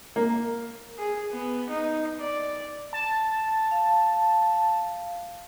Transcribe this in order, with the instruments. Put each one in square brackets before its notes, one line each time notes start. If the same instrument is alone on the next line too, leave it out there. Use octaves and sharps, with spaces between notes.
[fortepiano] A#3
[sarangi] G#4
B3
D#4
D5
[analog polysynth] A5
[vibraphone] F5